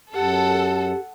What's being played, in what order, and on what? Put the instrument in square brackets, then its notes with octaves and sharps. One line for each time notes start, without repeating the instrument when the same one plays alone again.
[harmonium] F#2 [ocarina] G4 [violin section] A4 [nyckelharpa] F#5